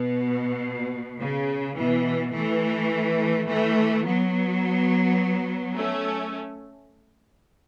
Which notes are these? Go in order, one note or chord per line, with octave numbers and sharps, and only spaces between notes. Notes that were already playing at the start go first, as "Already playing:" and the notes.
Already playing: B2
C#3
B2 E3
E3 A3
E3 A3
F#3 B3
A3 C#4